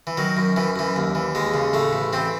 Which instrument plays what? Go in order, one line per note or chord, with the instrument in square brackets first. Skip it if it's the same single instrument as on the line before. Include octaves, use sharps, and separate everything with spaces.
[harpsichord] E3
D#3 F#3
F#2
F#2 E3
F#2 E3
D#2
E3
D#2 G#3
C#3
A2 A3
A1
E3 C4